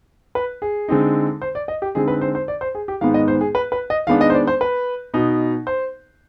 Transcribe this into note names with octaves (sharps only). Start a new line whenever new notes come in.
B4
G#4
D3 G#3 C4 D#4
C5
D5
D#5
G4
D3 G#3 C4 D#4 G#4
B4
C5
C5
D5
C5
G#4
G4
G#2 D#3 G#3 B3 F5
D#5
C5
G#4
B4
B4
D#5
D#3 G#3 B3 D4 F5
D#5
C5
D5
C5
B4
B2 B3 D#4
C5